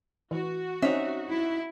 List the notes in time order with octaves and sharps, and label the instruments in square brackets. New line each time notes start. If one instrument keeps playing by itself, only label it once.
[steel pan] E3 [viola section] F#4
[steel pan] C4 C#4 [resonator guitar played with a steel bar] D#4 E5
[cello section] E4